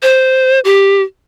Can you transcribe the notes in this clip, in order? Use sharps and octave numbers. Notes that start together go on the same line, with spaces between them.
C5
G4